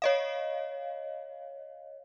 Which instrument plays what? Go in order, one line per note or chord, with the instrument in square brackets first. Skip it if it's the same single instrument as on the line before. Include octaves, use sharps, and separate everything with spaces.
[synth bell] C#5 D#5 F5